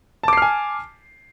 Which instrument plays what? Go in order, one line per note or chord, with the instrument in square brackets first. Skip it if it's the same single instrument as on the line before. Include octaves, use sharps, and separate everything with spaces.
[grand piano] A5
D6
C7
F6
G#5